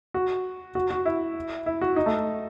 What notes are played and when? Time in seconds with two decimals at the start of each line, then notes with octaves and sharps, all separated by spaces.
0.14 F#4
0.75 F#4
0.91 F#4
1.05 E4
1.66 E4
1.81 F#4
1.96 D#4
2.06 A3